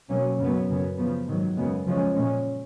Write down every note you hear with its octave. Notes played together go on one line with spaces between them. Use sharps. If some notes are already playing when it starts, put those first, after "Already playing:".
B2 F#3 A#3 C#4
F#2 C#3 F#3 B3
F#2 C#3 F#3 B3
C#3 F3 B3
G#2 D#3 F#3
F#2 C#3 G#3 B3
C#3 F3 G#3 C#4
A#2 G#3 C#4